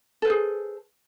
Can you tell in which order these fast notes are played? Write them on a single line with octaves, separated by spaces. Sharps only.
A4 B4 C5 G#4